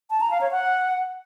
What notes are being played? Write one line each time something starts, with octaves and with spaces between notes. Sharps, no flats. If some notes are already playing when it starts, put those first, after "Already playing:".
A5
A#5
F5
C#5
F#5